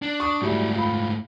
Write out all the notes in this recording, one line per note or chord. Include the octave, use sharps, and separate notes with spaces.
D4
C#6 D#6
G#2 F#3 G3 A3 E4
F4 B5